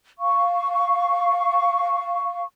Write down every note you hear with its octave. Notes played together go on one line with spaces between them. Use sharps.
F5 C#6